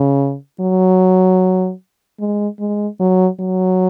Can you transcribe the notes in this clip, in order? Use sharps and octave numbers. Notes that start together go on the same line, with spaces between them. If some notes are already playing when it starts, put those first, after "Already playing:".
Already playing: C#3
F#3
G#3
G#3
F#3
F#3